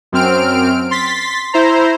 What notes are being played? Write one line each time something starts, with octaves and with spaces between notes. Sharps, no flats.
F#2 C4 F6 D7
C6 A6 B6
E4 C5 A#5